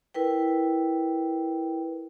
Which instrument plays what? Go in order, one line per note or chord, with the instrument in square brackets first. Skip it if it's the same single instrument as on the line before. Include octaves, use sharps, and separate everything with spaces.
[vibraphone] E4 A#4 B4 G5